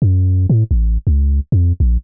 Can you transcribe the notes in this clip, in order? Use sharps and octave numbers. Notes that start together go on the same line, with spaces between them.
F#2
A2
A1
C#2
F2
A#1